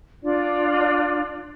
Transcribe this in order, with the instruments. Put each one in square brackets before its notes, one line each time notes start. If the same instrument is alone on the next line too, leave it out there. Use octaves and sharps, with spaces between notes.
[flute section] D4 F4 D5